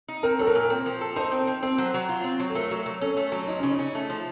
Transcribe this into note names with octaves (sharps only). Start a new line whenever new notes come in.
D#4
C4 A#4
F#3 A4
A#4
A#2
C4
F3
A4
D#4 C5
C4
F3
C4 C5
F#3
F#3
F4
C4
F#3
A4
A3 A#4
F#3
F#3
C#4 A4
A3
F#3
F3 D#4
C#3 C#4
D#4
C#4
A3
F3